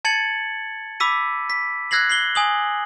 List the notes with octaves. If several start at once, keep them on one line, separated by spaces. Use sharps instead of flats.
A5 G#6 A6 C#7 F#7
B5 D6 E6 B6 D#7
B6
E6 F#6 G#6 A#6 C7 F#7
C7 F#7 G7
G#5 D#6 F#7